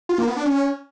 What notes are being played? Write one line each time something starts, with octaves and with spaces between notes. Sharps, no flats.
F4
A#3
B3
D4
C#4